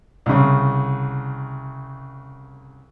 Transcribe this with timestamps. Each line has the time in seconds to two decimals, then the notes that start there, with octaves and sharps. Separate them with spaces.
0.26 C2 C#3